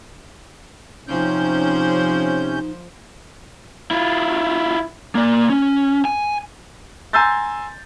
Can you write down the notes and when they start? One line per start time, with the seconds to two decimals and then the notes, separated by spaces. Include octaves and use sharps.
1.08 C3 F3 C#4 D#4 C5 G6
3.91 E4 F4
5.15 A#3 D5
5.50 C#4
6.05 G#5
7.13 G#5 A#5 C6 E6 G6 A6